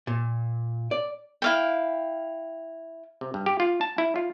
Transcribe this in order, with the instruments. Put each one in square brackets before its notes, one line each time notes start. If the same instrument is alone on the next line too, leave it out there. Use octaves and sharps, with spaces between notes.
[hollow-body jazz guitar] A#2
D5
[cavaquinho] E4 F5 G5
[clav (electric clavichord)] C3
G2
G4
F4
A5
E4
F4